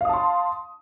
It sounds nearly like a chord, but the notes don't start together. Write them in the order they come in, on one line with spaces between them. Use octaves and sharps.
F5 D#6 A5 C6